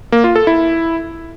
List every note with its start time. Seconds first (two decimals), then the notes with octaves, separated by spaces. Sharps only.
0.12 A#3
0.24 F4
0.36 A4
0.47 E4